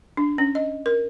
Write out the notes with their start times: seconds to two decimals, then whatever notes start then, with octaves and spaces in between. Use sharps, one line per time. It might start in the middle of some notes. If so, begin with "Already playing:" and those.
0.17 D4
0.38 C#4
0.55 D#5
0.86 A#4